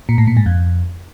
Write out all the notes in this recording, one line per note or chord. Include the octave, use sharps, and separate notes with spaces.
A#2
A2
A#2
G#2
F2